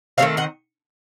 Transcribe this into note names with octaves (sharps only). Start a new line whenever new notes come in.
D#3 F#3 A3 C4 C#5 F5
D#5 F#5